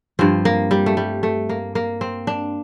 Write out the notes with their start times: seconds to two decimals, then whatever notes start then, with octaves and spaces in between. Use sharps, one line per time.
0.19 G2 F3 C4
0.45 A#3
0.71 G3
0.86 A3
0.97 G3
1.23 A3
1.49 A#3
1.75 A#3
2.01 C4
2.27 D4